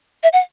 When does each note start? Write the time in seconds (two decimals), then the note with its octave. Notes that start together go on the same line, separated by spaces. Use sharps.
0.23 E5
0.33 F#5